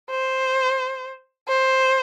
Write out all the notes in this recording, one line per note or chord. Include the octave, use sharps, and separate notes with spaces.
C5
C5